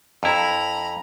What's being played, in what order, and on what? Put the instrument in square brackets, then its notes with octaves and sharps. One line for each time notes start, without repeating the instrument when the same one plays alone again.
[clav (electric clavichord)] F2 E4 [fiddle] A#5 B5